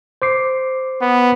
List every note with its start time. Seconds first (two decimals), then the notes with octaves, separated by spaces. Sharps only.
0.22 C5 D6 C7
1.02 B3